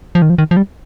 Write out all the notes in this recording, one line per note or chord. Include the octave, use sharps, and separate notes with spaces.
F3
D#3
F3
D#3
F3
G3